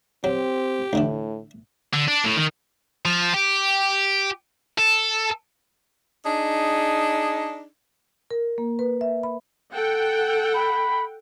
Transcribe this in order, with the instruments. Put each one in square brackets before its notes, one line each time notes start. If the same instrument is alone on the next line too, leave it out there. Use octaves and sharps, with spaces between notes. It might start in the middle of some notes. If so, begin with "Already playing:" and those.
[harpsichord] F#3 [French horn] C4 [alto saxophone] G4
[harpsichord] D2 D3 E3 [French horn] A2
[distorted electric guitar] D3
D4
A2
D#3
F3
G4
A4
[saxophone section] D4 D#4 G#4
[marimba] A#4
A#3
B4
E5
B5
[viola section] A4 F#5 G5
[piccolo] B5